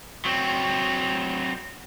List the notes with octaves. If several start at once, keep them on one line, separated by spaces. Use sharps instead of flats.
F#3 C4